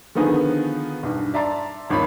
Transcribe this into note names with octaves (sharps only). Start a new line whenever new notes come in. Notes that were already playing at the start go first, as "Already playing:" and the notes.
D3 D#3 F3 B3 D#4 G#4
B1 E2 G2
D5 E5 A5 A#5 C6 A6
D#1 G#1 C#2 C#5 B5